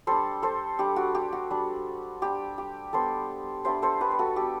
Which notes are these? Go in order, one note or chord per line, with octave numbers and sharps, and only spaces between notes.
G3 D4 A4 C5
A4 C5
G3 D4 G4
F#4
G4
F#4
G3 D4
G3 D4 G4
G4
G3 B3 D4 A4 C5
G3 B3 D4 C5 E5
A4 C5
G4 B4
B4
F#4 A4
G3 B3 D4 G4